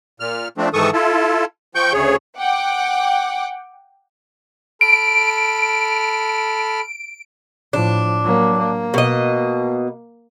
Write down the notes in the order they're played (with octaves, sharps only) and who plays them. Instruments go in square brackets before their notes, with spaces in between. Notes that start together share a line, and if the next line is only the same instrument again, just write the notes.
[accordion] A#2 F6
F3 A3 C4 D4
G#2 D#3 E3 A4 C#6 D#6
E4 F4 A4
F3 G5 C#6 G6
D2 C#3 G#4 C#5
[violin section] F#5 G5 D6
[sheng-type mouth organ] A4 B5 F6 [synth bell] D7
[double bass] A2 F3 [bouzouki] D4
[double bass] F#3 A#3
A#3
[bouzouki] B2 D#5